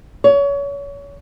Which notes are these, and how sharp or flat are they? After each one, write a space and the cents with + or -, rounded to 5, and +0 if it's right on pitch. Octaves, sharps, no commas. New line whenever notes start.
C#5 +30